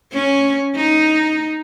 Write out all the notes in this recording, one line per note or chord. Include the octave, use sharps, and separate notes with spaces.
C#4
D#4